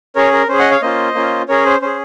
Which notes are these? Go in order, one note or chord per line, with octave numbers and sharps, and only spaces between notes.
C#4 G#4 A#4 C#5
A#4
C#4 G#4 C5
D#5 F#5
C#5 F5
A#3 C#4 F4 C5 D#5
A#3 C#4 F4
C#4 G#4 A#4 C#5
C5
C#4 G#4 C5